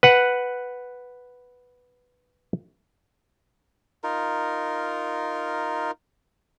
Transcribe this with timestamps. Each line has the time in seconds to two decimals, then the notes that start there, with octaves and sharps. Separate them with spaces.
0.03 B4 F#5
4.04 D#4 F4 A#4